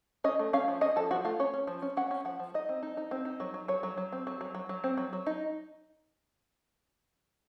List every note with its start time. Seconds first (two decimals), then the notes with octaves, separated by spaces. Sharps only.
0.24 C#4 D#5
0.39 A3
0.53 C#4 F5
0.68 F3
0.81 C#4 D#5
0.96 F3 A4
1.11 F3 F#4
1.25 A3 F4
1.40 C#4 C#5
1.54 C#4
1.67 F3
1.82 C#4
1.97 C#4 F#5
2.11 C#4
2.25 F3 F#5
2.40 F3
2.54 D#4 D#5
2.69 C4
2.82 D#4
2.97 D#4
3.11 C4
3.25 D#4
3.40 F#3
3.54 F#3
3.68 F#3 C#5
3.83 F#3
3.98 F#3
4.12 C4
4.27 F#3
4.41 F#3
4.55 F#3
4.69 F#3
4.84 C4
4.97 F#3
5.13 F#3
5.26 D#4